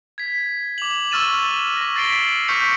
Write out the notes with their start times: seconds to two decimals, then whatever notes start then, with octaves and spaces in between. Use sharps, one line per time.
0.18 G#6 B6
0.78 D6 F7 F#7
1.11 C#6 E6 F6 A6 D#7 E7
1.77 C#6 A#6
1.96 A6 B6 C7 D7 F#7 G7
2.48 C#6 F6 G6 B6 C#7 F7